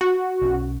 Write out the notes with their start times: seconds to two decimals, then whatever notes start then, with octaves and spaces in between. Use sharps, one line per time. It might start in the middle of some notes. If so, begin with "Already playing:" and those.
0.01 F#4
0.41 B1 C#4